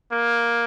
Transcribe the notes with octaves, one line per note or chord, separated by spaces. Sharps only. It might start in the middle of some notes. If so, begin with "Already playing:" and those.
A#3